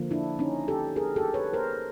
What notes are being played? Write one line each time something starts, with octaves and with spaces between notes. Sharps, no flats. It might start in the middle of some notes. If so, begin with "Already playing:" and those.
Already playing: D3 F3 A#3
D4 E4
C#4 D#4
G4 A4
G#4 A#4
G4 A4
B4 C#5
A#4 C5